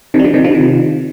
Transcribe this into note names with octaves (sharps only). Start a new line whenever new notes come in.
C3 D#3
G3
D3 F3
C3 D#3
D3 F3
C3 D#3